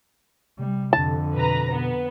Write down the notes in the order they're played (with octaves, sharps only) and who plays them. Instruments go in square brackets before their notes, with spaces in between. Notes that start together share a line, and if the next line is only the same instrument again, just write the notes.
[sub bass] C3 [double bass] G3
[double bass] F2 D3 [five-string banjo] A5
[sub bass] B2 [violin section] B4 A#5
[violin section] B3